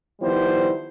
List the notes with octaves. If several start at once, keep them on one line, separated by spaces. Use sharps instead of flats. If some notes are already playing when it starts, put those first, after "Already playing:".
D#3 F3 G3 B3 E4 C5